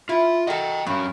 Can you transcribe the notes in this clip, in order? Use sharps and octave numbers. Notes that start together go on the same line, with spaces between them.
E4 F4
F#4 A4 D#5 G5
G2 F#3 C#4